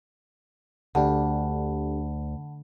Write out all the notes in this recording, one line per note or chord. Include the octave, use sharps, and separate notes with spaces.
D2 D4 G4 A4 F#5 A5 B5